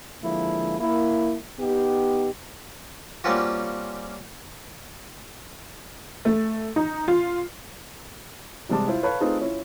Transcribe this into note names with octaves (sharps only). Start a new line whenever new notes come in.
D3 F3 G#3 A#3 E4
A#3 E4
B3 D#4 G4
G3 A#3 C4 C#4 F4 F#4
A3
D#4
F4
C3 G3 G#3 A5 D6
E4 F4 C5
A4 B4 C#5 F5 A5 B5
A3 C4 D#4 F4 G#4 B4
C#4 E4 F4